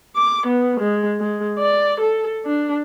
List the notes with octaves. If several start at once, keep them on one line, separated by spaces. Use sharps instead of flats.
D6
B3
G#3
G#3
D5
A4
D4